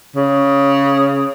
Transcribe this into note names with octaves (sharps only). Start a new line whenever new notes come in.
C#3